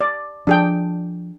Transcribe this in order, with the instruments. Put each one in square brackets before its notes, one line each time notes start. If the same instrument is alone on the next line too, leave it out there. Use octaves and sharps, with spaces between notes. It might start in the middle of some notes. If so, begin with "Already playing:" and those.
[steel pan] D5
[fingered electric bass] F3 [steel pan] D4 G#4 G5